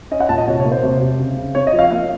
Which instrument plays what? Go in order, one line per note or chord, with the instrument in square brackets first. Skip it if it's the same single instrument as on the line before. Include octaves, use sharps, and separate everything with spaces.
[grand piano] C#4 D#5
F#5
A#2 A5
D#5
C3 C#5
C#5
A#3
C5
C3
C3
C#3
C#3
C4 C#5
D#5
F3
F5
A#3 F5